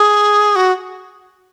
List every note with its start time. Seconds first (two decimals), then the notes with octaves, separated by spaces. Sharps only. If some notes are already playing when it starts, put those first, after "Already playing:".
Already playing: G#4
0.56 F#4